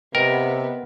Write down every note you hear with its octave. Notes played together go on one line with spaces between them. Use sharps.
C3 B3 A#4 D#5 G5